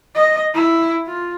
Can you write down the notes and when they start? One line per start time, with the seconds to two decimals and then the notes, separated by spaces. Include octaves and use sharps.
0.14 D#5
0.54 E4
1.06 F4